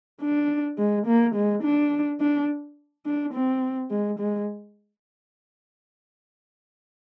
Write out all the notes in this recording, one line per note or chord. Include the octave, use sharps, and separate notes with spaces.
D4
G#3
A#3
G#3
D4
D4
D4
C4
G#3
G#3